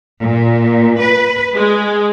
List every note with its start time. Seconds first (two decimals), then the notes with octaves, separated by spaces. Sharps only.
0.22 A#2
1.00 B4
1.55 G#3